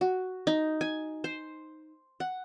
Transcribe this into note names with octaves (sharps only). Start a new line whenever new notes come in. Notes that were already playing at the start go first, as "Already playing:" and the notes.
F#4
D#4
G#5
C5
F#5